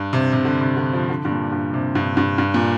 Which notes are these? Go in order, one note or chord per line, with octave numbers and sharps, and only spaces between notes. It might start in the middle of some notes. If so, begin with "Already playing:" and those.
Already playing: G2
C3
C3
D3
C3
D3
F3
D3
G2
A#2
G2
C3
G2
G2
G2
A#2